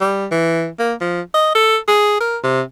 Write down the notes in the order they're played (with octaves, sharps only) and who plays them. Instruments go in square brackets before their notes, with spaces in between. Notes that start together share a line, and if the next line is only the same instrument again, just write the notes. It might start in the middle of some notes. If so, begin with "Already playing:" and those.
[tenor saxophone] G3
E3
A#3
F3
D#5
A4
G#4
A#4
C3